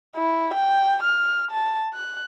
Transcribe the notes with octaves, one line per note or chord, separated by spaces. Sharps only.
E4
G5
F6
A5
F#6